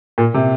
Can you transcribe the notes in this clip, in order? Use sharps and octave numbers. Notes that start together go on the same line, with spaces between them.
A#2
C3